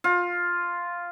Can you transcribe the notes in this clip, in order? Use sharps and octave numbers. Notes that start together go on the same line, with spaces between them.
F4